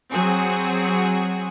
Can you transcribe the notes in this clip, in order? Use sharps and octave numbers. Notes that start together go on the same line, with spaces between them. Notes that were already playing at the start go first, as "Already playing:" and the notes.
F#3 C4 F#4 G#4